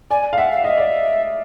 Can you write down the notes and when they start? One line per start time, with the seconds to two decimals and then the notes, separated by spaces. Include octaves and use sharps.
0.10 D5 G#5
0.33 F5
0.37 E5 F#5
0.51 F5
0.64 D#5 E5
0.78 D5